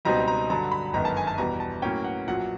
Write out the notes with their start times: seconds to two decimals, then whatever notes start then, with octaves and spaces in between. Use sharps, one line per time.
0.05 C#2 B2 G3 C4 D#4 A#5
0.28 A#5
0.50 G2 D3 F#3 A#5
0.72 B5
0.93 G1 F#2 D#3 G#3 B3 A#5
1.05 A5
1.17 G#5
1.27 A5
1.38 E2 B2 G3 A#5
1.60 A5
1.82 A2 F#3 A#3 C#4 G5
2.04 F#5
2.28 A#1 A#2 F#3 F#5